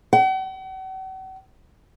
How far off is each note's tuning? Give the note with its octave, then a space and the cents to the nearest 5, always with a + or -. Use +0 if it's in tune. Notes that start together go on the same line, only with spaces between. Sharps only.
F#5 +45